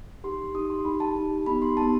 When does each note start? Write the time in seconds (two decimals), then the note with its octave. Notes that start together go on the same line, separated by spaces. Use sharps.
0.24 D#4 G4 C6
0.54 D#4 G4 D#6
0.70 C6
0.85 D#4 G4 B5
1.00 A5
1.16 D#4 G4
1.46 B3 D#4 G4 B5
1.62 C6
1.77 B3 D#4 G4 A5